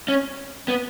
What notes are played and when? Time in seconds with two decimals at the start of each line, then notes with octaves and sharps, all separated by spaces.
0.08 C#4
0.68 B3